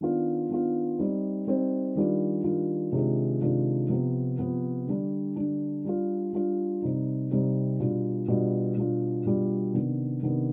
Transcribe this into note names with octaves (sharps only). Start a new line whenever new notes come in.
D#3 B3 D4 F4
D#3 B3 D4 F4
G3 C4 D#4
G3 C4 D#4
D#3 G3 D4 F4
D#3 G3 D4 F4
C3 D#3 G#3 D4 F4
C3 D#3 G#3 D4 F4
C3 F3 B3
C3 F3 B3
D3 G3 D4
D3 G3 D4
G3 D4 F4
G3 D4 F4
C3 G3 C4 D#4
C3 G3 C4 D#4
B2 G3 D4 F4
B2 G3 D4 F4
B2 G3 D4 F4
B2 G3 D4 F4
C3 D#3 B3 D4
C3 D#3 B3 D4